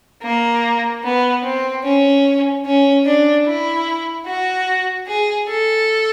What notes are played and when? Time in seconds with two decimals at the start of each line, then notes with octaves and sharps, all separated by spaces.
0.22 A#3
1.03 B3
1.44 C4
1.84 C#4
2.65 C#4
3.06 D4
3.46 E4
4.26 F#4
5.07 G#4
5.48 A4